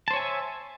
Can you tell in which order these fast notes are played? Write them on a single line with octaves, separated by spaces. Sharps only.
A5 C5 C#5 G#5 E5